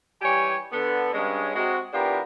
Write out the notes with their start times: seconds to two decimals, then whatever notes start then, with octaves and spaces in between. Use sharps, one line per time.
0.22 E3 G3 G4 C#5 G#5
0.72 D3 B3 A4
1.13 G2 G#3 C#4
1.54 C3 G#3 F#4
1.93 E3 B3 D4 F4 G4 A#4